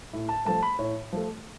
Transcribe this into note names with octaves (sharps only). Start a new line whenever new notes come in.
A2
A5
F3 A3 A5
B5
A2 C#5
F3 A3